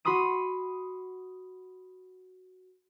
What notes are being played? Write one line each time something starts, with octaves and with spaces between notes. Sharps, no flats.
F#4 B5 C6 D#6 D#7